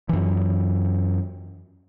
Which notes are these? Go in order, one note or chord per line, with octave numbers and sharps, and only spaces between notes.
F#2 E3